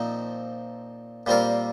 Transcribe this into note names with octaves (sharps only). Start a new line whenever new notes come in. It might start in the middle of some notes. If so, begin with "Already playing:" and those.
Already playing: A#2 F3 C4 D#4
A#2 G3 C4 F4 A#4